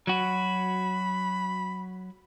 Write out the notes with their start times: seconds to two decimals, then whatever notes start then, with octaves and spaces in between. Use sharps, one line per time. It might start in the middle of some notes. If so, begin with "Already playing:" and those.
0.07 F#3 F#4 B5